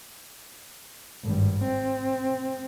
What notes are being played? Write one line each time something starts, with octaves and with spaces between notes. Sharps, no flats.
G#1 G2
C4